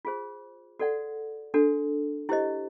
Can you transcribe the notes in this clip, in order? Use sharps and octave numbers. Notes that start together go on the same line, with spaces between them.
F4 G#4 C5
F#4 A4 D5 F#5
D4 F#4 A4
E4 G4 C5 D#5